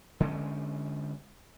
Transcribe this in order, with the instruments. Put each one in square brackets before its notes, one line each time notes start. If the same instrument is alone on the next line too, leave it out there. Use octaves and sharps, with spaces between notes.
[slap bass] D3 G#3 B3 C#4